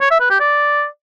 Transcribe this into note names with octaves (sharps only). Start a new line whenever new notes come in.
C#5
E5
B4
G4
D5